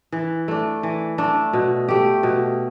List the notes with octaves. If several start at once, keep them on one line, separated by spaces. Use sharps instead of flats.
E3
A3 D4
E3
A3 D4
B2
A3 G4
B2